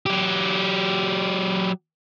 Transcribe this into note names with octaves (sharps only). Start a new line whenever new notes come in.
F#3 G4